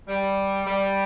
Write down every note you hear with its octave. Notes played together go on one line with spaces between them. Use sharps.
G3
G3